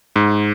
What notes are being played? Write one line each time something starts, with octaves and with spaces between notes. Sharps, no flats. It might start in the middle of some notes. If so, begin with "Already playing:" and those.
G#2